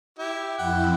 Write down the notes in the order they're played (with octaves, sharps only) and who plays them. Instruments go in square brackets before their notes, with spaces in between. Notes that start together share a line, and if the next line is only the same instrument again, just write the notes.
[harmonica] E4 G4
[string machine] F2 E4 [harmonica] F#5 G5